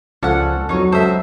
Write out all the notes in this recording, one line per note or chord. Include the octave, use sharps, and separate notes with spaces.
C#2 F3 C#4 A4 D5 F#5
F2 F#3 D#4 C#5
C#2 A4 C5 D#5 E5